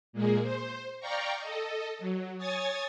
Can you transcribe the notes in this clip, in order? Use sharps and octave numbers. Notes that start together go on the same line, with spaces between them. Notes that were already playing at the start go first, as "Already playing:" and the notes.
A#2 G#3 A#3 G#4
C5
D5 F5 G5 A#5 C#6
A4 D#5
F#3
C#5 G#5 D#6 G#6 A6